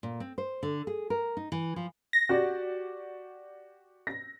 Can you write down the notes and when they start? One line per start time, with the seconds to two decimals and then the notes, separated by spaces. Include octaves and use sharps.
0.03 A#2
0.20 C4
0.38 C5
0.63 D3
0.87 G#4
1.10 A#4
1.37 D#4
1.52 E3
1.76 F3
2.13 A#6
2.29 F#4 G4 D5
4.07 A#6